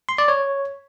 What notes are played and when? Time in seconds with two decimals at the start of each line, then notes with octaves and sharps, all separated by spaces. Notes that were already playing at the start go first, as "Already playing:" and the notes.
0.09 C6
0.18 D5
0.28 C#5